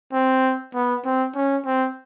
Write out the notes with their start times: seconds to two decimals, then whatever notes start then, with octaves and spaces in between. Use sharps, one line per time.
0.13 C4
0.74 B3
1.05 C4
1.35 C#4
1.66 C4